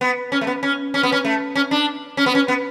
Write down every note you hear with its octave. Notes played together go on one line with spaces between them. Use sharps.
B3
C#4
A3
B3
C#4
C#4
B3
C#4
A3
C#4
D4
C#4
B3
C#4
B3